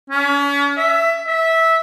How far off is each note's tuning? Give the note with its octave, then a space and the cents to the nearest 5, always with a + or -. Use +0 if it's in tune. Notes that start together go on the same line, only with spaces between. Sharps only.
C#4 +40
E5 +15
E5 -15